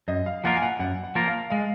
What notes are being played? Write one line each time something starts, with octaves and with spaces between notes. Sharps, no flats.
F#2 D#5
F5
F3 A#3 F4 A#4 F#5
G#5
F#5
F#2 F#5
F#5
F3 A#3 F4 A#4
F5
G#3 F5